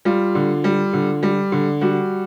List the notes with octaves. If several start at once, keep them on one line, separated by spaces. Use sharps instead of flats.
G3 F4
D3
G3
D3
G3
D3
G3 F#4